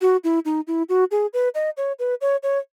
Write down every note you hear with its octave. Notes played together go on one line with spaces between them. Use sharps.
F#4
E4
D#4
E4
F#4
G#4
B4
D#5
C#5
B4
C#5
C#5